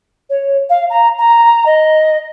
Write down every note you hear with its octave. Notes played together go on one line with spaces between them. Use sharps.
C#5
F5
A#5
A#5
D#5